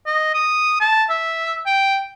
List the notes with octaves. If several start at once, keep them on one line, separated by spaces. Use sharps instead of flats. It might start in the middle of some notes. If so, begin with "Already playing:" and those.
D#5
D#6
A5
E5
G5